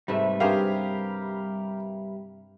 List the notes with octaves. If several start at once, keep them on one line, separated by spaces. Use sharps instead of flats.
G#2 C3 G3 A3 B4 E5
G2 G4 G#4 A#4 C5 F5